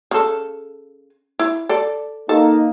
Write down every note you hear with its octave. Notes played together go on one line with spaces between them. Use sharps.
C#3 A4
E4
A4 D5
A#3 D#4 A4